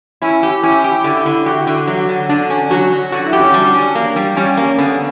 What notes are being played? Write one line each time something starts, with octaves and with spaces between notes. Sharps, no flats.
C#4 E4
G4
C#4 E4
G4
D3 E4
D3
F#4 G4
D3
F#3
D3
D3 D4
C#4
F#3 F#4
F#3
D3 F#4
E4
G4
C#4
G3 D4
C#4
A#3
G3
G3 C#4
A#3
D3 B3